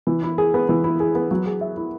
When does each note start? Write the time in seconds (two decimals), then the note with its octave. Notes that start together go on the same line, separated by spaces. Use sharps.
0.07 E3
0.23 E4
0.38 G#4
0.54 B3
0.69 E3
0.84 E4
1.00 G#4
1.15 B3
1.31 F#3
1.46 G#4
1.61 E5
1.77 E4